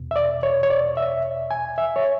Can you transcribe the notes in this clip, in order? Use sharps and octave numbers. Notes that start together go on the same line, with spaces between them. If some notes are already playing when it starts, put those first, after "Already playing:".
Already playing: E2 B2
E5
D5
C#5
C#5
D5
E5
G#5
E5
C#5